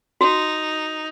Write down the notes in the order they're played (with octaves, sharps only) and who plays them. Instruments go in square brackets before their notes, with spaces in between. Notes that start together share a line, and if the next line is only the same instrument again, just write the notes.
[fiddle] D#4 [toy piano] F#4